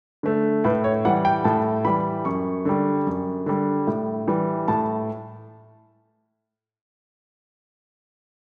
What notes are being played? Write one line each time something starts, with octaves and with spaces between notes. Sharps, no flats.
D3 A3
A2 B4
C#5
E3 G3 F#5
G5
A2 A5
E3 G3 B5
F#2 C#6
D3 G3
F#2
D3 G3
A2
E3 G3
A2 A5